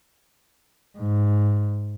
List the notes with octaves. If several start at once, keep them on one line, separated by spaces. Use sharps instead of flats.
G#2